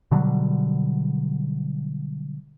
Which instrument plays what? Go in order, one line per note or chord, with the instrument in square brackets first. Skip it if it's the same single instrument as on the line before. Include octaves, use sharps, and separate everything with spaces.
[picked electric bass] B2 D3 F#3 G3